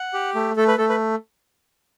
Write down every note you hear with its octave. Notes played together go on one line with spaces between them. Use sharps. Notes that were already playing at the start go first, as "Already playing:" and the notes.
Already playing: F#5
G4
A3
A3 A4
B4
A3 A4
B4